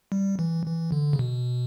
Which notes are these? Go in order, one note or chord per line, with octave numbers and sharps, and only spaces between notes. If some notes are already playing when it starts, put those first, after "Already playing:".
G3
E3
E3
D3
C#3
B2